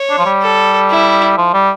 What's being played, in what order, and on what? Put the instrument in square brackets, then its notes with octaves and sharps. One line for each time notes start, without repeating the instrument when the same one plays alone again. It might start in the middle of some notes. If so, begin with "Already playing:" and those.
Already playing: [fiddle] C#5
[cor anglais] D4
F3
G3
[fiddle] A4
E4
[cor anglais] F3
G3